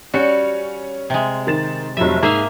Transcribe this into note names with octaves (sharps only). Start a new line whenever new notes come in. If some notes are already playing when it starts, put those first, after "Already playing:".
G3 C#4 F#4 C#7
C3 G#3
D#3 A6 E7
F1 F#3 G3 E5
G#2 A#3 G#4 E5 F5